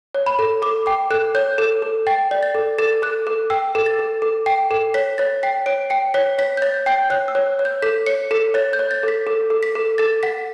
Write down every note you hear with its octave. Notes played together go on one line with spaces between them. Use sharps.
C#5
B5
A4
A4 D6
G5 D6
A4 F#6
C#5 G6
A4
A4
G5 A6
D5
A6
A4
A4 A6
A4 F#6
A4
G5 E6
A4
A6
A4
A4
G5
A4
C#5 B6
C#5 A6
G5 B6
C#5 D7
G5 C#7
C#5 B6
C#5 B6
G6
C#5 A6
G5 G6
C#5 F#6
E6
C#5
C#5
G6
A4 B6
C#5 C#7
A4 B6
C#5 A6
G6
C#5
A6
A4 B6
A4
A4
B6
A4
A4 A6
F#5 B6